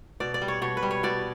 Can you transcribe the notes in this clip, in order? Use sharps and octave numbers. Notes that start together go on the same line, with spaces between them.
B2 D5
D5
G3
C#5
B2 C#5
B4
G3
C#5
B2 D5